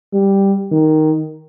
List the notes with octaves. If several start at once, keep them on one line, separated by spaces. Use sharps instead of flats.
G3
D#3